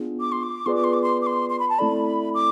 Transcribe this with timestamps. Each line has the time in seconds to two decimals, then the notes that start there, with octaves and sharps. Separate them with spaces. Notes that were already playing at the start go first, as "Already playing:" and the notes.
Already playing: B3 D4 F4 G#4
0.21 D6
0.32 C6
0.43 D6
0.66 B3 F4 G#4 B4 D5 C6
0.75 D6
0.84 C6
0.93 D6
1.03 C6
1.22 D6
1.27 C6
1.50 C6
1.60 B5
1.70 A5
1.79 A3 C4 E4 A4 D5 B5
2.34 D6